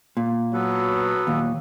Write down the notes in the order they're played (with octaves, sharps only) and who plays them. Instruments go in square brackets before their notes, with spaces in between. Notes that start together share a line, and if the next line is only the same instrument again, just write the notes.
[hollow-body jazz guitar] A#2
[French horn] F#3 [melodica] B3 A4 B4
[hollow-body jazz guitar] D#2 A#2